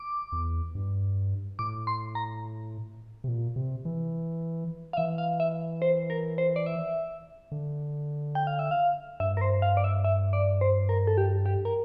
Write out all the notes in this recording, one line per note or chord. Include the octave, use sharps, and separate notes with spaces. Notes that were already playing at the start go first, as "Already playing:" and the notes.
Already playing: D6
E2
G2
A2 D6
C6
A#5
C3
A#2
C3
E3
F5
E3 E5
F5
E5
C5
A#4
C5
D5
E5
D3
G5
F5
E5
F5
G2 E5
A#4
C5
F5
D5
E5
E5
D5
C5
A#4
A4
G4
G4
A#4